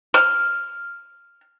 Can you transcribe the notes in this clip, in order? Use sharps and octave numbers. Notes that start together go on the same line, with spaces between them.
F6